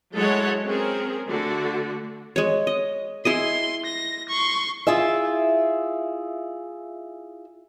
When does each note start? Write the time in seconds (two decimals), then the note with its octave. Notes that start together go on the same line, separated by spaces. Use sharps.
0.14 F#3 G#3 E4 A4 C#5 F#5
0.64 C4 C#4 G#4 A#4
1.28 D3 A3 F#4
2.36 G#3 C#5
2.67 D#5
3.25 E4 G#4 D#5 C6
3.85 A#6
4.29 C6 C#6
4.87 E4 F4 G#4 E5